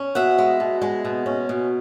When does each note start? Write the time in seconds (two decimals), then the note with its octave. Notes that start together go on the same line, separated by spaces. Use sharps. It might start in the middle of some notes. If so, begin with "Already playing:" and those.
Already playing: C#4
0.15 B2 E5 F#5
0.38 G#3
0.60 B2
0.82 G#3
1.05 B2
1.26 C#4
1.49 B2